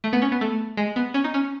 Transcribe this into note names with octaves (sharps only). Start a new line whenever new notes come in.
A3
B3
C#4
B3
A3
G#3
B3
C#4
D#4
C#4